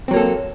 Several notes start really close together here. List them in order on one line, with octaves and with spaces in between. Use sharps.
C4 F#3 A#3 A4